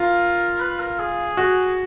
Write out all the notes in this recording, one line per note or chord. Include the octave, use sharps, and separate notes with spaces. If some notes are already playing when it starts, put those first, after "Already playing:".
Already playing: F4 A#4
B4
A#4
G#4
F#4